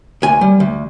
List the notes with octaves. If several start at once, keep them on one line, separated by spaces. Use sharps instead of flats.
D2 G#5
G3
D2